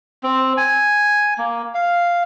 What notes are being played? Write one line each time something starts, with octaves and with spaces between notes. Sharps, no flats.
C4
G#5
A#3
F5